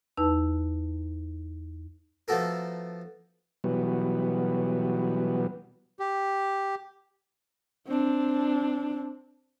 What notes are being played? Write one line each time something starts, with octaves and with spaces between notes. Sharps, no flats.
E2 D#4 B4 A5 E6
F3 A3 B3 F#4 A4 A#4
B2 E3 F#3 G3 B3
G4
C4 D4